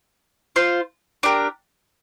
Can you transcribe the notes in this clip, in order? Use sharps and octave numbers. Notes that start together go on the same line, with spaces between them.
F4 C5 F5
D4 G4 A#4